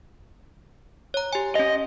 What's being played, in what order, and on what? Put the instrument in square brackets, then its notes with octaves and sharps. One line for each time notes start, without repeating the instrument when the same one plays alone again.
[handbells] C#5 A#5
G4 G#5
[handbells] C#4 G4 [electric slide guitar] D#5